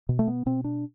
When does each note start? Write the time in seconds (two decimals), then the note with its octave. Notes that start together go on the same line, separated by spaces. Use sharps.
0.09 B2
0.19 A3
0.27 B3
0.46 B2 C4
0.64 D4